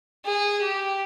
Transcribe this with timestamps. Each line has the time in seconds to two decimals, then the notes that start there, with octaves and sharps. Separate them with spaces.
0.26 G#4
0.62 G4